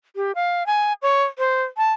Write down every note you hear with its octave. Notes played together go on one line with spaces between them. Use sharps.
G4
F5
G#5
C#5
C5
A5